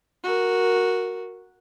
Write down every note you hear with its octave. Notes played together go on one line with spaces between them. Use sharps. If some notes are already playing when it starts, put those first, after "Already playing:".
F#4 A#4